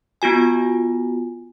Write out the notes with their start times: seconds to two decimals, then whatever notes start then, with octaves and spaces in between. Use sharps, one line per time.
0.22 B3 F4 F#4 G#5